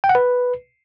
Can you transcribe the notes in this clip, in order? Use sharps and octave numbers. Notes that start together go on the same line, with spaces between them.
G5
F#5
B4